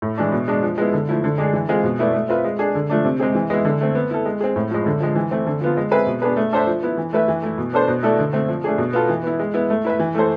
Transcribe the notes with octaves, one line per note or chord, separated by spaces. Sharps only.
A2
E3 G#3 D4
B2
G#3 D4
F3
G#3 B3 E4
D3
F3 A3 E4
D3
G#3 D4 G#4
E3
G#3 C4 F4 G#4
B2
A3 E4 B4 D5
A3
C4 F4 B4 E5
G#3
D4 G#4
D3
F3 A3 D4
C3
G#3 C4 G#4
E3
G#3 B3 E4
D3
A3 C4
B3
E4 A4
G#3
C4 G#4
A2
F3 G#3
D3
F3 G#3
E3
A3 C4
D3
F3 B3 F4
G#3
C4 G#4 B4 E5
B2
B3 D4 G#4 B4
A3
D4 A4 C5 E5
F3
B3 E4
E3
A3 E4 B4 E5
E3
A3 E4
B2
B3 D4 A4 C5
B2
A3 E4 A4 D5
D3
A3 C4
F3
A3 D4 G#4
B2
B3 F4 A4
E3
B3 E4
G#3
B3 E4
A3
E4 B4 E5
E3
A3 E4 A4 C5